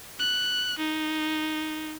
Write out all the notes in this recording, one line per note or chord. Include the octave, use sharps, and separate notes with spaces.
F#6
D#4